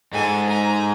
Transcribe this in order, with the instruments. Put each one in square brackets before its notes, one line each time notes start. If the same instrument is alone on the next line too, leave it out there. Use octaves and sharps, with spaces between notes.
[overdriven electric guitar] G#2 [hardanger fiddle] A4 G#5
[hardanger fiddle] G#5 A#5